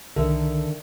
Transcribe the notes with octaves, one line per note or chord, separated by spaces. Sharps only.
C2 D3 D#3 A4 A#4 E5